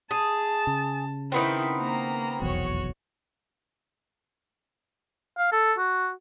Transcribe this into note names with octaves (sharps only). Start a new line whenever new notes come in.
G#4 A5
C#3
D#3 B3 C4 E4
A#3 A#5
F1 B1 E2 F#4 C#5
F5
A4
F#4